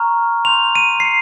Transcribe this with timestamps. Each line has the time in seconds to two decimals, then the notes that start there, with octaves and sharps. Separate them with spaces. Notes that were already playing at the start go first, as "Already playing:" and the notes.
Already playing: A#5 C#6 F6
0.45 C6 G6 F7
0.75 D#7
1.00 C7
1.05 C#7